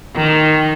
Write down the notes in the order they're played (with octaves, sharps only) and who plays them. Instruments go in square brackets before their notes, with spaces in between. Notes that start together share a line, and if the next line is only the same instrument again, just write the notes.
[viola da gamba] D#3